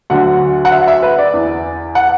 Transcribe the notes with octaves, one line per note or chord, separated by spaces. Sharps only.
D2 D3 F#3 F#5
F#5
E5
E5
B4
D5
E2 E3
F#5